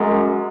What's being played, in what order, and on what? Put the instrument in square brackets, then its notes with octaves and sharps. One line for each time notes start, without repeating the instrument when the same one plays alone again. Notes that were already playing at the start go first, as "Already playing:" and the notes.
Already playing: [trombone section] F#2 [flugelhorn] G#3